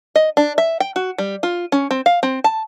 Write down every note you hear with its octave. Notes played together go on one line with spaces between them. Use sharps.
D#5
D4
E5
G5
F#4
G3
F4
C#4
C4
F5
C4
A5